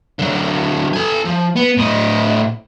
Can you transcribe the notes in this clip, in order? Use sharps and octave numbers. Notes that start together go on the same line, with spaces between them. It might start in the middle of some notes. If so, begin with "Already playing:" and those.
D3 F#3
A4 G#5
F3
B3
A2 D#5